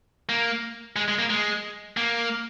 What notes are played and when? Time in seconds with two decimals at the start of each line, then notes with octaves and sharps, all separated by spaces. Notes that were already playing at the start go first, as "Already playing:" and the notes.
0.29 A#3
0.96 G#3
1.08 G#3
1.19 A#3
1.30 G#3
1.97 A#3